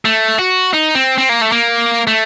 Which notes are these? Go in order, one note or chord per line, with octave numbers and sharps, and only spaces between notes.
A3
F#4
D#4
C4
C4
A#3
A3
A#3
A3